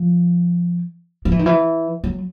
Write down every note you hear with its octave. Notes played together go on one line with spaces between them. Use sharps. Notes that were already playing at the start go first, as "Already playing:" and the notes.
Already playing: F3
F3
E3
D#3
E3
F#3